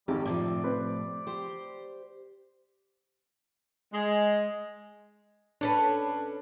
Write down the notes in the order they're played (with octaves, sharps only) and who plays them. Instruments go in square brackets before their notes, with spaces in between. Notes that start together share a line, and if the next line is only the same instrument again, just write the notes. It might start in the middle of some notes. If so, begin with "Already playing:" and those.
[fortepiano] G#1 [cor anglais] G3 [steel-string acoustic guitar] G4
[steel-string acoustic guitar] A2 C3 F3 [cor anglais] D5
[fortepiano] C4 B4
[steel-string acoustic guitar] G4 C5
[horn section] G#3
[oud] C#4 A4 B4 [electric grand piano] D4